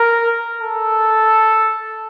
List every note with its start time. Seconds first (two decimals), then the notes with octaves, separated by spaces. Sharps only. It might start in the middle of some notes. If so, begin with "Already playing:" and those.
Already playing: A#4
0.61 A4